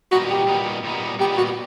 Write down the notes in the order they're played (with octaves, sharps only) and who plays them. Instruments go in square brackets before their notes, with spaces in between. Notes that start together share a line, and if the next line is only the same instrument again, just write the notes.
[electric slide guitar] A#2 G3 B3 D#4 [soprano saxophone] F#4
[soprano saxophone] G4
[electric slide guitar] A#2 G3 B3 D#4
A#2 G3 B3 D#4
[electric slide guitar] A#2 G3 B3 D#4 [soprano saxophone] G4
[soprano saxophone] F#4